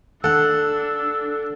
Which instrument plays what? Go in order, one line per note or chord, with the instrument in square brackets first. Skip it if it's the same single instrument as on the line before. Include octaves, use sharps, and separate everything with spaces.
[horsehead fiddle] D4 [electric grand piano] A4 [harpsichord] F#5 [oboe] E6